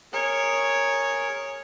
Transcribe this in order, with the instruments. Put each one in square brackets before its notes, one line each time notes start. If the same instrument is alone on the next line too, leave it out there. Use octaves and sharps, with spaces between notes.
[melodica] G#4 A#4 [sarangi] C#5